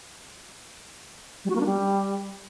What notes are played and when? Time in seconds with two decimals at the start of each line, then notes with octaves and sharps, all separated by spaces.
1.45 G3
1.50 F#4
1.55 A#3
1.61 D4
1.66 G3